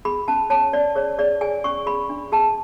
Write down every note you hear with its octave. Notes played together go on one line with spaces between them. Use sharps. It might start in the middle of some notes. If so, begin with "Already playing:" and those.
G#4 B5
C#4 A5
C#5 A5
C#4 D5
G#4 C#5
G#4 D5
G#4 G#5
C#4 C#6
G#4 B5
D4
G#4 A5